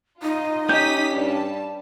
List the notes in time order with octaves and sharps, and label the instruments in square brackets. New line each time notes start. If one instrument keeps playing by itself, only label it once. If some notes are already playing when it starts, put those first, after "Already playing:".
[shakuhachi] D#4 [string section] F4 D#5
[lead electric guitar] C#4 G4 [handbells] D#5 G6 [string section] D#6 B6
[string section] G2 G3 A5